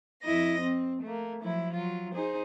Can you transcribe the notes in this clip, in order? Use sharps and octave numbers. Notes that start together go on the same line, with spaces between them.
F2 E4 D#5 A#6
C4
A3 A#3
F3 F#3 E4
F#3 F4
D#4 G#4 C5